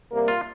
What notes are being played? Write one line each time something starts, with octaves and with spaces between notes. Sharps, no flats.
C3 G3 A#3
F4